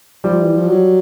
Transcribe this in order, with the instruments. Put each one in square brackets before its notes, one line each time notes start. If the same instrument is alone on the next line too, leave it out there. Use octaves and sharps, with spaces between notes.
[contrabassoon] F3 [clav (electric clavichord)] G3
[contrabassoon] E3
F3
F#3